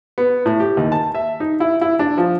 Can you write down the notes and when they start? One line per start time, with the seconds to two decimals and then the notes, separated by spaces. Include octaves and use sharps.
0.18 B3
0.46 A2
0.60 G4
0.77 D#2
0.92 A5
1.15 E5
1.40 D#4
1.60 E4
1.81 E4
1.99 D4
2.18 F3